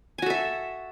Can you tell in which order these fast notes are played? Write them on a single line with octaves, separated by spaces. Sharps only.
G#5 F#4 A4 E5